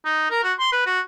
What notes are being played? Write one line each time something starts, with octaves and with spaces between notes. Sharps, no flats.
D#4
A#4
F#4
C6
B4
F#4